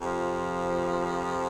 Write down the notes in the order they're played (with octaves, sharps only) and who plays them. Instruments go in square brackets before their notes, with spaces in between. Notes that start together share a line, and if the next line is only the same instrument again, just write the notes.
[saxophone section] F2 C3 F3